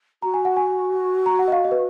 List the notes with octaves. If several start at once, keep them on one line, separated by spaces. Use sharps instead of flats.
F#4 A#5
G#5
F#5
G#5
A#5
F#5
D#5
F5
D#5
B4